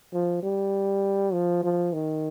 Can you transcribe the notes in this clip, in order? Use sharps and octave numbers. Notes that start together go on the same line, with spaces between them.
F3
G3
F3
F3
D#3